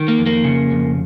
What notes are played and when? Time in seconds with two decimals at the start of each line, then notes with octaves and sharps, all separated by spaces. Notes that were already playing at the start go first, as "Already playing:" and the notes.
Already playing: D#3
0.08 A#3
0.18 F2
0.26 A#3
0.44 C#3
0.71 F2